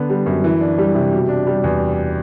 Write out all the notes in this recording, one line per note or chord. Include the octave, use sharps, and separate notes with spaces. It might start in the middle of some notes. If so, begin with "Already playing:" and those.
Already playing: D3 B3
G3
F#2
E3
D4
G3
C3
B2
D4
G3
E2